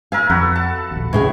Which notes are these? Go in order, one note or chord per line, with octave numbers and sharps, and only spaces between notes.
A#4 E5 F5 G#5
F2 F#4 A4 B4
A5
A#1 D#2
A2 C#3 G#4 C#5